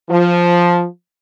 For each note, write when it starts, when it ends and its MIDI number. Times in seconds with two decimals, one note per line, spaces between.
0.10 0.85 53